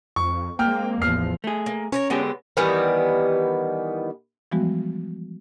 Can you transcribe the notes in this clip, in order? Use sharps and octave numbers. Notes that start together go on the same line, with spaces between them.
F2 C#6
G#3 A#3 C4 G5 F6
A1 E2 F3 F6 C7
A3 G#4
A#3
C#4 A#4 B4 C#5
D3 F#3 G#3 B3 G4
D#3 E3 G3 B3
E3 F3 G3 G#3 B3 F#4